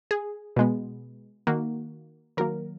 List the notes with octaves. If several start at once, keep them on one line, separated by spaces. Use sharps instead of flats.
G#4
B2 G#3 B3
D#3 A#3 F#4
D#3 F#3 A#3 A#4